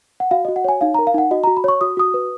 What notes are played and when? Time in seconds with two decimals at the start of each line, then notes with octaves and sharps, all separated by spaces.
0.20 F#5
0.31 F#4 F5
0.45 D#5
0.48 F#4
0.56 F#5
0.64 C#5 G#5
0.81 D#4 F5
0.94 A#5
0.99 A#4
1.07 F5
1.14 D#4 F#5
1.31 F#4 D#5
1.44 F#4 A#5
1.57 B5
1.64 C#5 C#6
1.81 F#4 D#6
1.97 F#4 D#6
2.14 B4